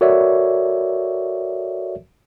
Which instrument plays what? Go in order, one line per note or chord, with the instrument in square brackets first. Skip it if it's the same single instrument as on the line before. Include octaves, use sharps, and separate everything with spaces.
[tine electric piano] F#4 A4 A#4 C#5 D5 E5